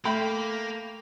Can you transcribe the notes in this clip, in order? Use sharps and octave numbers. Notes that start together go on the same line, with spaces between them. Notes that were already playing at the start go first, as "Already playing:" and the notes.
A3 A#3 G5 B5